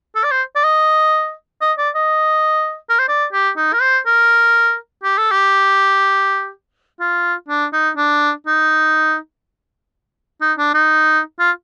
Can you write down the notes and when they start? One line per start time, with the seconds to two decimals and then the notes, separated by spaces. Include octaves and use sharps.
0.15 A4
0.24 D5
0.31 C5
0.56 D5
0.64 D#5
1.61 D#5
1.78 D5
1.95 D#5
2.90 A#4
2.99 C5
3.08 D5
3.33 G4
3.57 D#4
3.73 A#4
3.81 C5
4.07 A#4
5.04 G4
5.18 A4
5.32 G4
7.00 F4
7.49 D4
7.73 D#4
7.97 D4
8.47 D#4
10.41 D#4
10.58 D4
10.74 D#4
11.39 F4